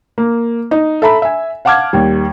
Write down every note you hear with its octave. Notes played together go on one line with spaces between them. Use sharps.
A#3
D#4
A4 E5 A#5 B5
E5 G#5
F5 F#5 A5 D6 F6 G#6
D#2 G3